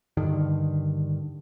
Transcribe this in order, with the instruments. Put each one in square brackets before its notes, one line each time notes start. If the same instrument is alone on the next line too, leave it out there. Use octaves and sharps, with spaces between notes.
[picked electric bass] G2 D3 D#3